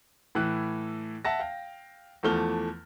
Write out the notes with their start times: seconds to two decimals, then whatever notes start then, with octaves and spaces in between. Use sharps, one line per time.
0.35 A2 E3 E4 F#6
1.25 E5 F#5 A5 A#6
1.39 F5 G5
2.23 E2 E3 F3 A3 F6 G7